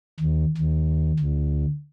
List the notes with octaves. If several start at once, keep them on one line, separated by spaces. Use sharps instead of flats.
D#2
D#2
D2